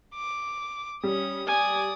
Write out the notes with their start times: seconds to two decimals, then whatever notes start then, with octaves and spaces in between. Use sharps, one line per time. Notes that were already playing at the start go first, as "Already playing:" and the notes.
0.15 D6
1.03 G3 C#4 D#6
1.47 D5 G#5 D#6